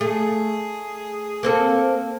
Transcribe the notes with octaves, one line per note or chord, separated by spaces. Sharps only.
A3 G#4
A#3 C4 A4